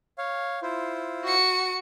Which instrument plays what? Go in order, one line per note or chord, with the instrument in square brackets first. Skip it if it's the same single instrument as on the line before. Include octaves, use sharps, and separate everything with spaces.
[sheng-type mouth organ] C#5 F5
E4 F4 C5
[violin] F#4 C#7